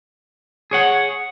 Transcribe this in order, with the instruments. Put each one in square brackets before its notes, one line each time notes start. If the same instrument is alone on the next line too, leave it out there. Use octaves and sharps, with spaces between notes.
[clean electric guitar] G#4 C#5 F#5